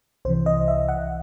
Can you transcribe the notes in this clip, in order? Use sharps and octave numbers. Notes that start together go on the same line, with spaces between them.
C2 C3 E3 C5
D#5
E5
F#5